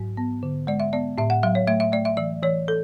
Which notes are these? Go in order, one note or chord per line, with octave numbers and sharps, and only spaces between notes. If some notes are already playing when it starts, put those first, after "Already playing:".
Already playing: G#2 F#3
B3
D3
G#3 D5
E5
B3 D5
A2 E5
F#5
F#3 E5
C#5
A3 E5
E5
A3 D5
E5
E3 D5
E3 C#5
A4